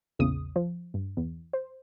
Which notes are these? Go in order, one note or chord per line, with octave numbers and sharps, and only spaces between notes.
A#1 E2 C#3 D#6
F3
G2
E2
C5